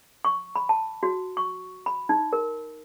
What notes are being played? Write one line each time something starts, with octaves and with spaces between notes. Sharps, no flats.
C#6
B5
A5
F#4
C#6
B5
D#4
A#4